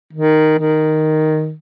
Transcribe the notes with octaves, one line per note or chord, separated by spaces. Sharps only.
D#3
D#3